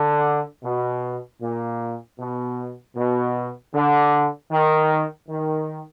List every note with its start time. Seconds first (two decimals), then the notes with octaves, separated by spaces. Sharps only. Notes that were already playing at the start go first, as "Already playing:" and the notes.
Already playing: D3
0.64 B2
1.42 A#2
2.19 B2
2.96 B2
3.74 D3
4.51 D#3
5.29 D#3